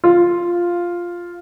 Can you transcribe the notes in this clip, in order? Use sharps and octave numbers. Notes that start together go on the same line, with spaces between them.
F4